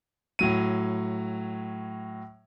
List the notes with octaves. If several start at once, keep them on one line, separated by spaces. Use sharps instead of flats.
A2 F#3 D#7